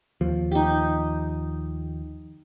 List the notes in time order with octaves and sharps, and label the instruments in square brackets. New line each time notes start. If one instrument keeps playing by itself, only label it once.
[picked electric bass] D#2 F3
[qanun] D#4 G4